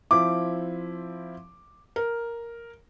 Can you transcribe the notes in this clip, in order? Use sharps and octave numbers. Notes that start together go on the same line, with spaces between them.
F3 C4 E4 D6
A#4